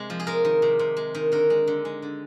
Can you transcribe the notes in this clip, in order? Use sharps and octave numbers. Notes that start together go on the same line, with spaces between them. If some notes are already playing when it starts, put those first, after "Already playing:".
Already playing: C3 G#3
F3
G#4
G#3 A#4
D#3
C3
C3
G#3
D#3
D3 A#4
G#3
D3
G#3
D3